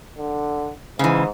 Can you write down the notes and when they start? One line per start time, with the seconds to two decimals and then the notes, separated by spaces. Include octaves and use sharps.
0.18 D3
0.99 G#2 C#3 E3